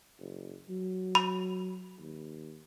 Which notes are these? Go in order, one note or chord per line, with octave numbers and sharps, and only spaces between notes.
F#1
F#3
B5
D#2